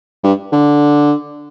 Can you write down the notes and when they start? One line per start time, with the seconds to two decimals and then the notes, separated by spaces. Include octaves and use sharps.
0.23 G2
0.52 D3